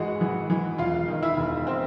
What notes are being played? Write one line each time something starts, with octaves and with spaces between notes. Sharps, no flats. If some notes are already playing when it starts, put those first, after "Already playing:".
Already playing: G#1 E3 G#3 F#4 F#5
E3
E3
E1 F4 F5
D#3
E4 E5
E1
C4 C5